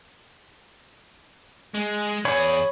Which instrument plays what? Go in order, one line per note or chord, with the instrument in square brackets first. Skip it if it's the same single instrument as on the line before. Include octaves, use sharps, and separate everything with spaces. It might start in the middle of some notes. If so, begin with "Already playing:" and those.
[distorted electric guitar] G#3
[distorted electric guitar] E2 G#4 [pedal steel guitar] C#5 B5